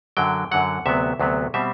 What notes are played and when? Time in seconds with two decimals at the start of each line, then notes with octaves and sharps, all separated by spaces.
0.17 F#2 D3 F#3 G5
0.51 F#2 D3 F#3 F#5
0.86 D2 C3 F#3 B3 E5
1.20 D2 C3 F#3 B3
1.54 B2 G3 C4 E5